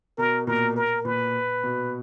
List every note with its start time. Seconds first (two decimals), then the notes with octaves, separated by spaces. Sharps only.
0.18 B2 A#4
0.47 A#2 A#4
0.76 A#4
1.05 A#2 B4
1.64 B2